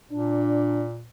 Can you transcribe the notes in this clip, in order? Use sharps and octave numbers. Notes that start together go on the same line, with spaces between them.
A#2 D4